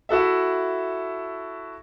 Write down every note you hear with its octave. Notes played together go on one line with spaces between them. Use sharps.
E4 F#4 A4 E5